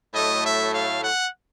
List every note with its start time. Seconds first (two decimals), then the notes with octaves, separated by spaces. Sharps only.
0.14 A2 F#3 A3 D#5
0.43 E5
0.73 F5
1.02 F#5